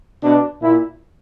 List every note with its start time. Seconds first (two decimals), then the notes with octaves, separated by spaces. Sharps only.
0.23 B2 D4
0.61 A#2 E4